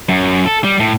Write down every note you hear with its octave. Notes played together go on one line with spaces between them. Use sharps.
F#2
A4
G3
A2